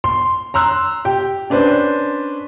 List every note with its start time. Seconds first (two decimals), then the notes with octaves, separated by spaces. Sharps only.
0.04 C6
0.54 A#5 C6 E6 F#6
1.05 G4 G5
1.50 C#4 D4 B4 C5 D5